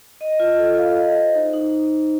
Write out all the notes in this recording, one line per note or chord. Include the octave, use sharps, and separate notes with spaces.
D#5
F4
A4
F5
D#5
C5
D#4
D#4